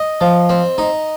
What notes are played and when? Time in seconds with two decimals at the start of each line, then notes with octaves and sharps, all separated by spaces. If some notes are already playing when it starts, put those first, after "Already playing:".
Already playing: D#5
0.21 F3
0.49 C4
0.78 D#4